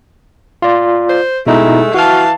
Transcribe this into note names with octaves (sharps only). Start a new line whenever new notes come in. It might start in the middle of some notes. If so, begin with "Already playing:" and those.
F4 D5
C5
B2 G#3 A3 D#4 E4
E3 F#4 F5 A5 F6